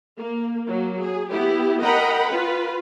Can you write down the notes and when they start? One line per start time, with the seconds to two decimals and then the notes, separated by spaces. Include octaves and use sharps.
0.17 A#3
0.68 F#3 A#3
1.01 G#4
1.30 B3 E4 G4
1.81 A#4 D#5 F#5 G5 A#5 B5
2.28 F4 B4